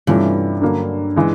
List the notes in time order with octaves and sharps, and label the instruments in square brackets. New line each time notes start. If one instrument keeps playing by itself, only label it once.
[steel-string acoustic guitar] G2 [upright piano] C3 E3 A3 C#4 F4
[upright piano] D3 F#3 A#3
E3 G#3